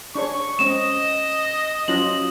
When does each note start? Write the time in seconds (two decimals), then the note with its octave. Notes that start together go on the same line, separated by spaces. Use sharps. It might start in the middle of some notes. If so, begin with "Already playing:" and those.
0.15 D4 G#4 C#5 C#6
0.59 G#3 C4 C#4 D#5 E7
1.88 F#3 C#4 F4 F#7